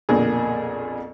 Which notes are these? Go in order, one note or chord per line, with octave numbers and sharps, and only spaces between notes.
B1 F2 A#2 D3 A#3 G#4